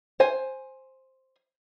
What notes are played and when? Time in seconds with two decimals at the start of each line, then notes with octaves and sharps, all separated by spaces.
0.20 C5 G#5